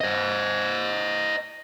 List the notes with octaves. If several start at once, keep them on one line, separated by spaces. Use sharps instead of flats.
C5 D#5